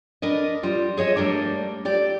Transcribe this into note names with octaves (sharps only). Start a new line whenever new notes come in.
D4 A#4 B4 D#5
G3 F4
G#4 C#5 D#5 E5
G3 A3 A#3 D4
E4 G4 D5